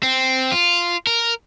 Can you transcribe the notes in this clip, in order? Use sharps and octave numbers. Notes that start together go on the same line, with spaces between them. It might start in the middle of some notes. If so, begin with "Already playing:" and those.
C4
F4
A#4